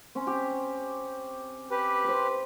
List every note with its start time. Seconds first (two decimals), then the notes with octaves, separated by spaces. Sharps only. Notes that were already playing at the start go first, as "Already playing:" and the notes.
0.15 C4 C#4
0.27 G4
1.71 G4 B4
2.04 C5 B5